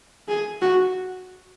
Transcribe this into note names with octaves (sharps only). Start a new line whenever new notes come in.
G#4
F#4